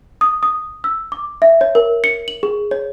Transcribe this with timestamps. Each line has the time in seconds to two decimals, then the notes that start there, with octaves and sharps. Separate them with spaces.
0.21 D#6
0.43 D#6
0.84 E6
1.12 D6
1.42 E5
1.61 C#5
1.75 A#4
2.04 C#7
2.28 F#7
2.43 G#4
2.71 C#5